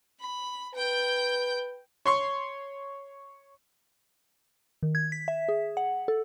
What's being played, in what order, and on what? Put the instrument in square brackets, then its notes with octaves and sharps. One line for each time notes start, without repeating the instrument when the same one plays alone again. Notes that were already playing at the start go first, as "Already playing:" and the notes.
[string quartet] B5
[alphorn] B4 [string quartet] G5 G6
[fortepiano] C#5 C6 C#6
[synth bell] D#3
G#6
B6
E5
G#4
F#5
A4